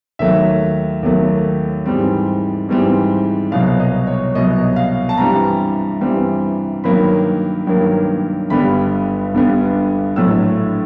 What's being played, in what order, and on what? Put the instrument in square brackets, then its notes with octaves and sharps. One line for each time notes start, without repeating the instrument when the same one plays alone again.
[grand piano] D#2 D#3 F#3 A3 E5
D#2 D#3 F#3 A3
G#2 E3 G3 C4
G#2 E3 G3 C4
C2 B2 F#3 F5
D#5
C#5
C2 B2 F#3 D#5
F5
A5
G2 E3 G3 C4 A#5
G2 E3 G3 C4
G2 D#3 F#3 A#3 B5
G2 D#3 F#3 A#3
G1 G2 D3 G3 B3 B5
G1 G2 D3 G3 B3
A#1 A2 F#3 A3 E6